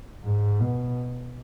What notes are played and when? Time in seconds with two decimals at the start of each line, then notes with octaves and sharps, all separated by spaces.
0.24 G#2
0.60 B2